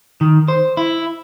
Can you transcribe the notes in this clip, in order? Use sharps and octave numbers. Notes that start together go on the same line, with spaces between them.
D#3
C5
E4